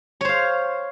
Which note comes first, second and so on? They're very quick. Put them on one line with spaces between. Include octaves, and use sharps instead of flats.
C#5 C5 F5